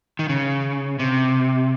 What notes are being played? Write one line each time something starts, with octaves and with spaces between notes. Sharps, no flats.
D#3
C#3
C3